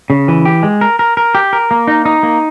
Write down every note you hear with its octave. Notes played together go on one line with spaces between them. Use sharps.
C#3
E3
G4
G#3
A#4
A#4
A#4
G4
A#4
A#3
D#4
D#4
A#3